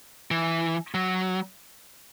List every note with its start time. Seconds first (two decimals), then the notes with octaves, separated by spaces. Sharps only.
0.31 E3
0.94 F#3